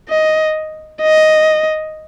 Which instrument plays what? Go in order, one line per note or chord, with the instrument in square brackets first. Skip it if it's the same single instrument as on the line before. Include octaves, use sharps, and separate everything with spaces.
[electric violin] D#5
D#5